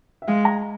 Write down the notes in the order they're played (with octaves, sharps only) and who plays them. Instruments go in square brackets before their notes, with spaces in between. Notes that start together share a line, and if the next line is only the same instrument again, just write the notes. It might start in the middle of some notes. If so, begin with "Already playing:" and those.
[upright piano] E5
[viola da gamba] G#3 [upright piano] F5
[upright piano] A#5